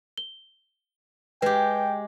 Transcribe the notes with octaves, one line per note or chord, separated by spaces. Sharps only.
G7
G#3 G4 B4 G5